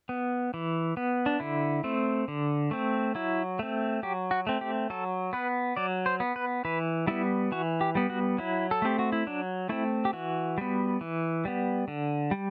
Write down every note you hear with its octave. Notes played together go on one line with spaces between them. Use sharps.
B3
E3
B3
D4
D3 E4
A3 C4
D3
A3 C4
F#3 E4
A3 C4
F#3 G4
F#4
A3 C4
G4
F#3 A4
B3 B4
F#3 D5
C5
B3
B4
E3 B4
G3 B3 E4
E3 F#4
G4
G3 B3
F#4
F#3 E4
A4
A3 C4 G4
F#4
E4
F#3 D4
A3 C4 E4
G4
E3 F#4
G3 B3
E3
G3 B3
D3
G3